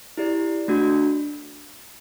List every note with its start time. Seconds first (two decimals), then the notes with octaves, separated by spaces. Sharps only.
0.18 E4 G4 D5
0.68 A3 D4 F#4